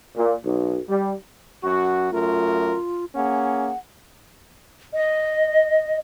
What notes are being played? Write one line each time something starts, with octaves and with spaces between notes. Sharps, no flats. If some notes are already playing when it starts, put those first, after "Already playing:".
A#2
B1
G3
F#2 F#4 C#6
F#2 A3 F4 A#4
A#3 C#4 G#4 F#5
D#5